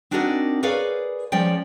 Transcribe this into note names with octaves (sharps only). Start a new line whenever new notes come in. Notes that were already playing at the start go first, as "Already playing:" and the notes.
C4 D4 D#4 F#4 A#4 D#5
G#4 A#4 B4 C#5 D5 F5
F3 G#3 C#4 D5 G5